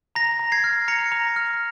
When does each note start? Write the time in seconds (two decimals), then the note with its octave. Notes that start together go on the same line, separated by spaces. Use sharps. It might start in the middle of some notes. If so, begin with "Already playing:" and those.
0.15 A#5 A#6
0.39 A#5
0.52 G#6 C7
0.64 F6
0.88 A#5 A#6 C#7
1.12 A#5
1.36 F6